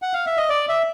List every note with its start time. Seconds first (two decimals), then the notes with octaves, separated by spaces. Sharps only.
0.02 F#5
0.14 F5
0.27 E5
0.37 D#5
0.49 D5
0.69 E5